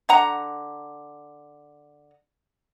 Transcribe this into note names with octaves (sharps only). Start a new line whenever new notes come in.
D3 F#5 A#5